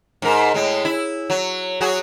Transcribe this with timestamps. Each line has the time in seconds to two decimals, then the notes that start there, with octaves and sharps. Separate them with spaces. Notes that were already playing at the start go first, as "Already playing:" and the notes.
0.22 G#2 A#4
0.54 A2 G#3
0.85 E4
1.30 F#3
1.81 F#3 F#4 G#4